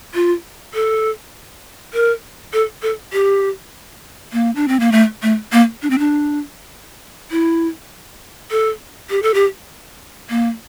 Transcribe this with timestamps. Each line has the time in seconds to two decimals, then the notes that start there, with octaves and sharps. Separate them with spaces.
0.14 F4
0.74 A4
1.94 A#4
2.53 A4
2.82 A4
3.13 G4
4.33 A#3
4.56 D4
4.68 C4
4.80 A#3
4.92 A3
5.22 A3
5.52 A#3
5.82 D4
5.90 C4
5.99 D4
7.31 E4
8.51 A4
9.10 G4
9.23 A4
9.34 G4
10.30 A#3